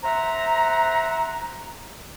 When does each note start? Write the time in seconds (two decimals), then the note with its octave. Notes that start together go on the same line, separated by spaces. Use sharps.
0.03 C5 E5 F#5 A#5